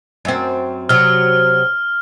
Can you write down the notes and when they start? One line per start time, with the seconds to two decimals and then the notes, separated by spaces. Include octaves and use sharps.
0.25 F#2 C4
0.89 C3 F#3 F6